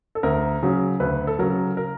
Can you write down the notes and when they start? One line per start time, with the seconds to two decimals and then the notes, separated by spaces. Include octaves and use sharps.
0.15 A4
0.23 D2 A#4
0.63 C#3 F#3
1.00 D2 B4
1.27 A4
1.39 C#3 F#3 A#4
1.77 A#4